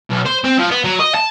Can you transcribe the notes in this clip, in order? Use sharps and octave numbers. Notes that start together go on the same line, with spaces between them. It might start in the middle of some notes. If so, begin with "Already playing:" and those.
B1
C5
C4
F3
B3
F#3
D#5
A5